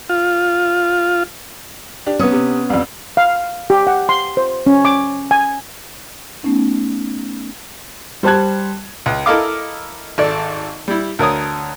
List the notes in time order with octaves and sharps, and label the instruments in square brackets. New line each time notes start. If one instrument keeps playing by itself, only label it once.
[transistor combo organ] F4
[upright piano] D4 G4
[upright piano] C3 D#6 [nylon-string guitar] B3 C#4
[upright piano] C3
C2 F2
[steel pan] F5
G4
F#5
C6
C5
C#4
D6
G#5
[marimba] A3 B3 C#4 D#4
[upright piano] G3 C5 A5 F#6 G#6
[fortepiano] C#2
E4 A4 A#4 D#5 F5 D6
G#1 A4 D5
G3 E4
D2 A#4 C#5 D#6